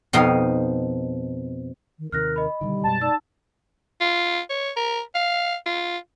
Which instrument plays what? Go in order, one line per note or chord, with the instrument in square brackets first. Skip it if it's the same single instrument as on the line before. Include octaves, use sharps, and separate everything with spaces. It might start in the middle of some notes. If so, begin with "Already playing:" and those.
[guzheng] F2 B2 F3 D#4 D#5 F5
[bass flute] D#3
[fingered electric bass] D#2 C3 D#3 [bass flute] A#4 [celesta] F6 F#6 A#6
[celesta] D#5 B5
[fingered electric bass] B2 D3 D#3 [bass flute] G3
[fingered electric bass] F#2 B2 G#3 [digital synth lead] A5
[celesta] D#4 E6 [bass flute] D5
[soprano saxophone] F4
C#5
A#4
F5
F4